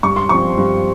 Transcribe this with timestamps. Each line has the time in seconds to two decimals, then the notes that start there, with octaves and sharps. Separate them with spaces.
0.03 G2 C#6
0.16 C6
0.29 F3 C4 C#6
0.57 G2